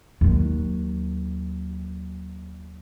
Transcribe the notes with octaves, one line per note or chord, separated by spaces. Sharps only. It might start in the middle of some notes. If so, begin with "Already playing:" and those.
D#2 F#3